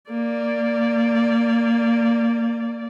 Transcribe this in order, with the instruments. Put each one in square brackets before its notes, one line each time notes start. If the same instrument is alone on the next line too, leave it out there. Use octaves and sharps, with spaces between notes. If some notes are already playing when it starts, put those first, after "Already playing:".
[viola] A#3 D5